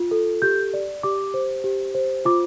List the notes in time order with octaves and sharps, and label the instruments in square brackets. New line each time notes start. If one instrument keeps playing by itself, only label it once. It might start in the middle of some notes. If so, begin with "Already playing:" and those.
Already playing: [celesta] F4
A4
G4 G6
D5
G4 D6
C5
G4
C5
F4 D6